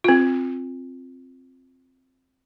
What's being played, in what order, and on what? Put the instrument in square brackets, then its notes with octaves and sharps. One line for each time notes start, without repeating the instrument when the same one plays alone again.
[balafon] C4 F4